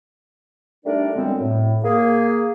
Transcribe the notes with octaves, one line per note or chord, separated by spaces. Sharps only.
G3 A3 D4 D#4 A#4 D5
F#2 D3 G3 G#3 B3 C4
A2
A#3 G#4